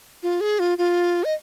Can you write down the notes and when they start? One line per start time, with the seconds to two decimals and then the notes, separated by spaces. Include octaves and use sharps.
0.23 F4
0.41 G#4
0.59 F4
0.78 F4
1.24 D#5